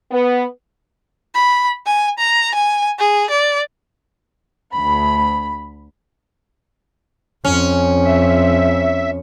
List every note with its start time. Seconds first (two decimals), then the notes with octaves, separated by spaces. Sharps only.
0.11 B3
1.35 B5
1.86 G#5
2.19 A#5
2.55 G#5
2.99 G#4
3.30 D5
4.73 D2 B5
7.45 F2 C#4
8.05 E5